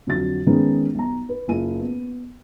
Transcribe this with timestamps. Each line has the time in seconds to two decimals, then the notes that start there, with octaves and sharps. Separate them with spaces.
0.07 F2 D3 F#3 A6
0.47 D#3 G#3 B3 C#4 D#4
0.95 B1 A#5
1.29 B4
1.48 F#1 F4 G#5 D#7
1.80 B3